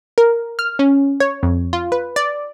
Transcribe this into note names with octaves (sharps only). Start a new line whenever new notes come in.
A#4
F6
C#4
C#5
F2
F4
B4
D5